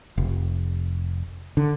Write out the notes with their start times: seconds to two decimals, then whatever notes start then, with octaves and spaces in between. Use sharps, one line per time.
0.18 F1
1.57 D3